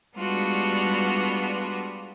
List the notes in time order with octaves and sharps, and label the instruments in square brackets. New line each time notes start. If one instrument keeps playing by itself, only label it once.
[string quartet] G3 G#3 B3 D4 F4 F#4